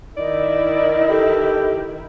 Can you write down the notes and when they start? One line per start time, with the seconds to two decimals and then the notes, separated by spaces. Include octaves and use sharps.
0.17 D#3 E4 D5 D#5
1.09 G4 A4